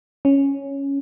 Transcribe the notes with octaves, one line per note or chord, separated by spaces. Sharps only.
C#4